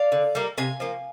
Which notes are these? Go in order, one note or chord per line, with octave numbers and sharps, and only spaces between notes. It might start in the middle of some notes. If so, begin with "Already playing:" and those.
Already playing: D5 F5
D3
G3 A#3
C3 F5 G#5
F3 A#3